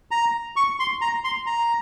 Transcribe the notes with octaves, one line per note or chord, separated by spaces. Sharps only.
A#5
C#6
C6
A#5
C6
A#5